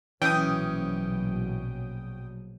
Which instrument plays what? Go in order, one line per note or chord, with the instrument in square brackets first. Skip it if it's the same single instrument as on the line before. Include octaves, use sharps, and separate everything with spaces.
[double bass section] A#1 B2 F#3 [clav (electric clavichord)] E3 [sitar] C#4 [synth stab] G5 D#6